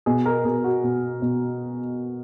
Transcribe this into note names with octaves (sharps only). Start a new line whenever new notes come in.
B2 G#4
A#4
B2 G#4
F#4
B2
B2